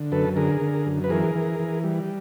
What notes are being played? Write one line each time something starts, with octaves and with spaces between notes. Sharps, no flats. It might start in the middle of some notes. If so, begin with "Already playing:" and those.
Already playing: D3
F#2 A4 B4
D3 G#4 A#4
D3
F#2
B4
E3 G#4 A#4
E3
E3
G3